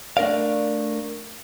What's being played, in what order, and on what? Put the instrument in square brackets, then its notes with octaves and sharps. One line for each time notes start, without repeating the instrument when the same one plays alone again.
[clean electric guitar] A3 D4 A#4 D5 F5